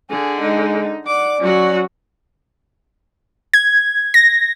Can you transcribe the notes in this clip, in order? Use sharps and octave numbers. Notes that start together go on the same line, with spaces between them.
D3 G#4
G#3 D#4
D5 F#5 D6
F#3 C#4 F#4
G#6
A#6